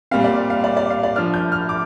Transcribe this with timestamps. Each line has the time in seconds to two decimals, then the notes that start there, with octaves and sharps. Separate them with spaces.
0.11 A#2 G3 C4 F5
0.24 D5
0.50 F5
0.64 D5
0.77 D5
0.90 F5
1.03 D5
1.16 F3 D4 F6
1.34 G6
1.52 F6
1.69 D6